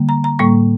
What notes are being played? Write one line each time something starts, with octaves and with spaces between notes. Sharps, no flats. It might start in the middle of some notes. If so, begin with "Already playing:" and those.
Already playing: D3 G3 A#3
A#5
A#5
A2 G3 A#3 C#6